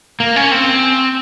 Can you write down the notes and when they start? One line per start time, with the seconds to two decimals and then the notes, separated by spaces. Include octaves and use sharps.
0.20 A#3
0.36 C#4
0.51 C4